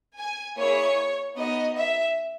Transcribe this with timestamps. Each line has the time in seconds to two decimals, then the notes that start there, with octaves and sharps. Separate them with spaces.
0.18 G#5
0.57 A#3 E4 G#4 C#5
1.36 B3 D#4 F#4 D#5
1.76 E5